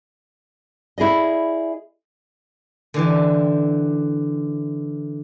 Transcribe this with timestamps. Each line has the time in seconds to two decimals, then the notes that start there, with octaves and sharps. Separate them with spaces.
0.98 E4 G#4 D5 D#5
2.94 D3 E3 G4